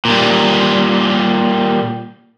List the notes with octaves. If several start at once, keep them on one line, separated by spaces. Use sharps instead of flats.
A#2 G3